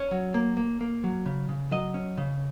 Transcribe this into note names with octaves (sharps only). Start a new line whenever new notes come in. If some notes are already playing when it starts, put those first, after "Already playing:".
Already playing: C#4 C#5
F#3
A#3
A#3
A#3
F#3
C#3
C#3
F#3 D#5
C#4
C#3